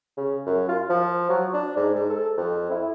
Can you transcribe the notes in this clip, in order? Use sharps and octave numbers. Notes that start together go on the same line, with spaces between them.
C#3
F#2
F4
F3
F#3
D4
G#2
G#2
A4
F2
E4